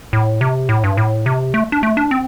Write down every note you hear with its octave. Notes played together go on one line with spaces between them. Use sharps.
A2
C3
A2
G2
A2
C3
A3
D4
A3
D4
C4